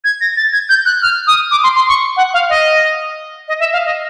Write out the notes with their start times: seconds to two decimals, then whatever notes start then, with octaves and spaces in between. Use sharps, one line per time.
0.04 G#6
0.21 A#6
0.37 A6
0.53 G#6
0.69 G6
0.86 F#6
1.02 F6
1.27 D#6
1.51 D6
1.63 C6
1.75 C6
1.89 C#6
2.17 F#5
2.34 F5
2.49 D#5
3.48 D#5
3.60 E5
3.73 F5
3.85 D#5